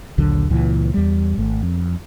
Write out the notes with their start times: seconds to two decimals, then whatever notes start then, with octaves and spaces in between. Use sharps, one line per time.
0.18 A#1 D#2 D3 F#3
0.50 C#2 A#2 E3
0.94 E2 G3
1.38 G#1 A3
1.63 F2